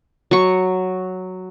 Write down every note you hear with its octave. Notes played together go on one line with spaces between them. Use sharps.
F#3 C#6